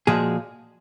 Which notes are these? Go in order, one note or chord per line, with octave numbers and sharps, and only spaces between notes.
A#2 F3 G#3 F#4 G#4